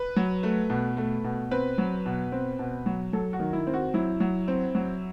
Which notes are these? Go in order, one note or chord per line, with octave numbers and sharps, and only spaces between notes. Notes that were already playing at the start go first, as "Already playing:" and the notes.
Already playing: B4
F#3
A3
B2
A3
B2
C4 B4
F#3
B2
C4
B2
F#3
F#3 A4
F#4
D#3
E4
C4
F#4
F#3 E4
F#3
C4
F#3